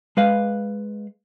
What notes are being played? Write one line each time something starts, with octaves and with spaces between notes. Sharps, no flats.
G#3 B4 F5